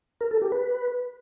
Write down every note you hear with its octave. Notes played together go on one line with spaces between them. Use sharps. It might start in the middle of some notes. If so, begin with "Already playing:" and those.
A#4
A4
G4
B4